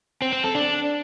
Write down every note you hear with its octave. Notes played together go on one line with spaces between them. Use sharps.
C4
C4
A4
D4